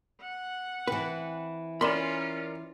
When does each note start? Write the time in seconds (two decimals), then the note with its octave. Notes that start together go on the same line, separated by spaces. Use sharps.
0.21 F#5
0.88 E3 C4 B4
1.81 C#4 F4 A#4 D5 B5 C6